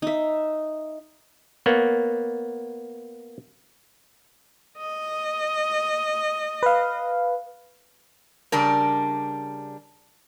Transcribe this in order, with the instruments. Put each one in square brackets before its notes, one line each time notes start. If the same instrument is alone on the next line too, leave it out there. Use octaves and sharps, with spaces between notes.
[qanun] D#4 E5
[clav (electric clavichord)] A#3 B3 C#5
[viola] D#5
[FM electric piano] B4 F5
[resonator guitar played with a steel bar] C#3 G3 D4 A#4